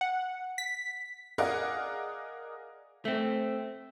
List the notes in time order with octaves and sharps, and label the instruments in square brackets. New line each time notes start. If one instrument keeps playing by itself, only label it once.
[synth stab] F#5
B6
[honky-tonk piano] G#4 A#4 D5 D#5 F5 F#5
[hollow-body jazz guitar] A3 C4